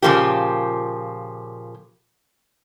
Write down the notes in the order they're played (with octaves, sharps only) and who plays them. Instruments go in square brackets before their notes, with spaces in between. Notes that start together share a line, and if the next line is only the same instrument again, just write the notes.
[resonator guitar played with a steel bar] A#2 C#3 F3 A#3 G4